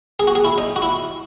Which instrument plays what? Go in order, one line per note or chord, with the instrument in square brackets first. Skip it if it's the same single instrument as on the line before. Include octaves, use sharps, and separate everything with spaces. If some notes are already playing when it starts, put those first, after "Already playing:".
[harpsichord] G#4
F#4
G#4
E4
D#4
F#4
E4